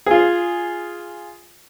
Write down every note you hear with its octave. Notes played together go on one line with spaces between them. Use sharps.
F4 G#4